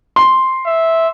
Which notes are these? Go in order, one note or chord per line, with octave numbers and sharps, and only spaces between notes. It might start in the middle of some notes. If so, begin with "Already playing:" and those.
C6
E5